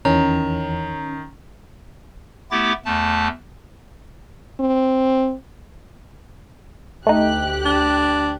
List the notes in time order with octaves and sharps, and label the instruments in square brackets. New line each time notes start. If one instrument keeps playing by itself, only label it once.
[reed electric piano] E2 E3 [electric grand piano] D#3 [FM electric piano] C#4 [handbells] A#5
[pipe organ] A3 B3 E4 G4 D6 A6
E2 A3 A5
[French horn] C4
[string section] D2 G4 F#6 [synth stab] A3 D#4
[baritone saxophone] D4